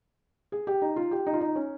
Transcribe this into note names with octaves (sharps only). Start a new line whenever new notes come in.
G#4
G4
D#4
F4
G4
D#4
F4
D#4
C#4